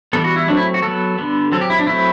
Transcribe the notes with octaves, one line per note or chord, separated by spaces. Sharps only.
E3 G3 B3 A4
F#4
E4
F#3 A3 C4 D4
E4
F#4
F#3 B3 A4
D3 G3 B3
F#3 C4 A4
G4
E4
D4
F#3 A3 C4 E4